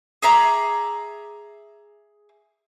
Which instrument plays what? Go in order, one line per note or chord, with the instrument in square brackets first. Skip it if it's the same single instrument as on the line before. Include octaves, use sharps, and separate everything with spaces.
[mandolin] G#4 E5 A#5 D6